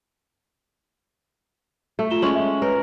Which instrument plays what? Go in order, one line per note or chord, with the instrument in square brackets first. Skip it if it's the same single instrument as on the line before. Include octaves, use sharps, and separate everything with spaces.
[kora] A3
[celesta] F4 E7 G7
[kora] G#3 C#4 [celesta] C#6 F#7
[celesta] E5
[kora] A#4 [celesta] B4 C#5 A#5